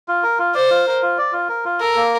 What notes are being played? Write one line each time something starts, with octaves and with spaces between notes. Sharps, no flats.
F4
A#4
F4
C5 D5
F4
A#4
F4
D5
F4
A#4
F4
A4 A#4
A#3